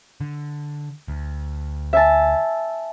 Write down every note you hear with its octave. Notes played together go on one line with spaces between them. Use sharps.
D3
D2
E5 G#5 A5